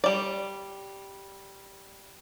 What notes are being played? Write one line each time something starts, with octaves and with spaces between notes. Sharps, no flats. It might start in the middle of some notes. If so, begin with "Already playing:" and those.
G3 D5